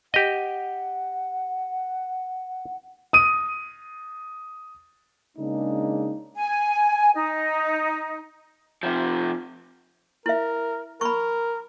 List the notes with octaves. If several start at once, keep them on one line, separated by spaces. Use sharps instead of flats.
G4 D#5 F#5
D#6 D#7
C#3 G#3 A#3 D4 D#4
G#5
D#4
C3 F3
E4 A#4 E5
A#4 B5 C#6